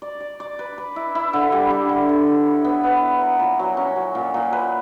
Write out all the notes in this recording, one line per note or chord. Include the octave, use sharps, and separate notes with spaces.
D5
D5
D5
B4
B4
E4
E4
D3
G3
D3
D3
D3
E4
C#5
B3
B3
E4
A#4
A#2
F#3
C#4
F#3
A#2
A#2
B4